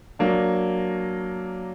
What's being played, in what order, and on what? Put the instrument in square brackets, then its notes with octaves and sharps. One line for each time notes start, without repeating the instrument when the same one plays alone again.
[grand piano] F#3 A#3 D4